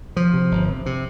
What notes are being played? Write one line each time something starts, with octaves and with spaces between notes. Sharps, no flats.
C3 F3
C3
G1
C3
C3